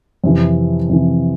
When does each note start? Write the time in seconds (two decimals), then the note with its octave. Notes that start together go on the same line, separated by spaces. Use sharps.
0.24 F2 C3 E3
0.89 F2 C3 E3